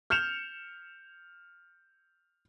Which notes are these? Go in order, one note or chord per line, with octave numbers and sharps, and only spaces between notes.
F6 G6 C#7 E7 F7